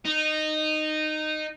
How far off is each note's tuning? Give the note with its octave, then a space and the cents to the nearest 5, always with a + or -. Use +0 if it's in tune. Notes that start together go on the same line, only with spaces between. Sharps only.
D#4 -15